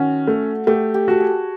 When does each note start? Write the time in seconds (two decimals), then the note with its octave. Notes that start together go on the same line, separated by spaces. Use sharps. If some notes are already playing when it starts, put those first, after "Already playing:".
Already playing: D#3 C#4 F#4
0.27 A3
0.67 A3 G4
0.94 G4
1.08 F#4 A4
1.20 G#4